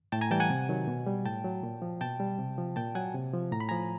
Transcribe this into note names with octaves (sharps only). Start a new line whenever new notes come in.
A2 G5 A5
G#5 A#5
E3 G3 G5 A5
F#5 G#5
C3
D#3 F#3
B2
G3
A2 G5 A5
F#3
A#2
F3
B2 G5 A5
G3
C3
F3
A#2 G5 A5
F#3 F#5 G#5
C3
F3
A2 A#5
B5
F3 G#5 A#5